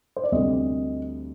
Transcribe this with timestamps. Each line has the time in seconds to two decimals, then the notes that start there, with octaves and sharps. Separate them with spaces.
0.16 C5
0.24 D5
0.32 D2 C3 G3 C4 D#5